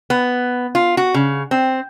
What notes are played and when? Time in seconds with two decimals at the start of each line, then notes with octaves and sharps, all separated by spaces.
0.10 B3
0.75 F4
0.97 F#4
1.14 C#3
1.51 C4